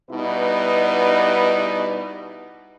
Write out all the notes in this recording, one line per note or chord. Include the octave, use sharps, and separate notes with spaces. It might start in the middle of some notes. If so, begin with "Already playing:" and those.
B2 G3 D#4 E4 B4